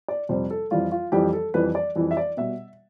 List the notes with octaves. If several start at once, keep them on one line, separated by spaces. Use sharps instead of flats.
D5
F2 C3 G3 C5
A4
F2 E3 G3 F4
F4
F2 E3 G3 G4
A4
F2 E3 G3 B4
D5
F2 E3 G3
E5
D5
B2 G3 E5